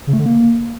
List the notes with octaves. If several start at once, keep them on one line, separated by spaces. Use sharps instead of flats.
C#3
A3
D3
A#3